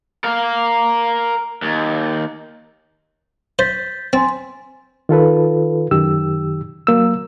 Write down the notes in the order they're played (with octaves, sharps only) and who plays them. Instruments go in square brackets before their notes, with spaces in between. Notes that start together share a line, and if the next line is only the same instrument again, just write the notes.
[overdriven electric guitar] A#4 F5
D#2
[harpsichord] C5 [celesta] G6 A6 B6
[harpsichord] C4 [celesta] G#5 C6 A6
[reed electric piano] D#3 F4 A4 B4
F#2 D#3 G4 E6
F#3 A#3 E6